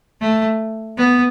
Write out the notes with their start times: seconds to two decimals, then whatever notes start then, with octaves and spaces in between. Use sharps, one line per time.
0.21 A3
0.97 B3